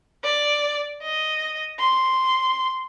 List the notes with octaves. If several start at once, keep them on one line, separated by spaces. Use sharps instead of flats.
D5
D#5
C6